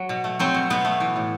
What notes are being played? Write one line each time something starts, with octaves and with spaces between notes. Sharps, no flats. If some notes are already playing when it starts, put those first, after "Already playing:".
Already playing: F#3
B2
A3
F#3 C4
B2
B2 B3
A3
E3
A2